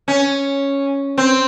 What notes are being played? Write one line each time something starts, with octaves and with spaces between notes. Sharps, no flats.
C#4
C4